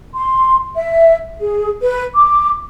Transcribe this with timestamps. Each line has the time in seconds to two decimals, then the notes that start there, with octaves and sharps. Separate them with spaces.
0.15 C6
0.75 E5
1.39 G#4
1.81 B4
2.14 D6